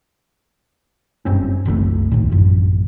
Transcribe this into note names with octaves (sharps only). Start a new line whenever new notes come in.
F#1 G2 C4 C#4
F#1 C2 D#3 A3
D1 G1 D#2 A2
A1 F#2